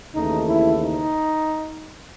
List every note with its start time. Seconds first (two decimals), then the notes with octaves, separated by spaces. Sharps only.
0.14 D#2 C#3 E3 A3 D#4
0.47 E4
0.79 D#4